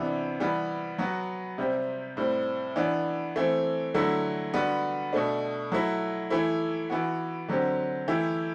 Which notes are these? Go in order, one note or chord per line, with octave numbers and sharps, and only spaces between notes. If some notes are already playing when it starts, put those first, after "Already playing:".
Already playing: C3 E3 B3 D4
E3 G3 B3
F#3 B3 F#4
C3 G3 C4 G4
A2 G3 C4
E3 B3 D4
E3 A3 C4
D3 F#3 A3 E4
D3 G3 B3 F#4
B2 A3 D4
F#3 A3 E4
E3 A3 E4
E3 B3 F#4
D3 F#3 C4 G4
E3 A3 E4 G4